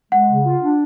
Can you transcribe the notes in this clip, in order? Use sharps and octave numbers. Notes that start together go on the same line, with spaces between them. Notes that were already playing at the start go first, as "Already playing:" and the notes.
G#3 F#5
C#3
F4
D4